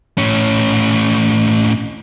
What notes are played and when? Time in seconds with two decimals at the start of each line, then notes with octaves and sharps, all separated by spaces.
0.18 A2 C#4